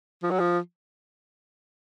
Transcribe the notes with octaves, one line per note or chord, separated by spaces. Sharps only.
F3
F#3
F3